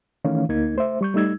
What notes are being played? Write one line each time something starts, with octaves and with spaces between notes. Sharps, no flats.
D#3 E3 A3 C#4 F5
D2 A#3 D#4 G#6
A3 C5 E5
G3 C#6 G6
G3 A3 D#4 E6 G#6